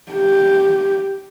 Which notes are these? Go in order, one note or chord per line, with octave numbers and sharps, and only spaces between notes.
G4